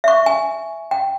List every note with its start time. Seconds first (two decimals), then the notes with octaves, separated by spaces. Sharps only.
0.04 E5 C#6
0.26 G#5
0.91 G5